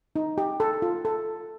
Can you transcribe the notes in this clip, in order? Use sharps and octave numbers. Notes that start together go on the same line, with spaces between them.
D#4
G4
A4
F4
A4